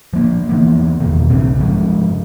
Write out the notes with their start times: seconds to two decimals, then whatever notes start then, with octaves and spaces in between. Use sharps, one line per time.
0.13 F3 A#3
0.49 E3 A#3 B3
1.00 E2 B2 D#3
1.30 B1 G#2 C#3 C4
1.60 G2 F3 G#3